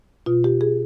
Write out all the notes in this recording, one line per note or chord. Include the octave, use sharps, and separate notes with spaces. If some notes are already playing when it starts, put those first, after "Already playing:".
B2 F4
G4
G#4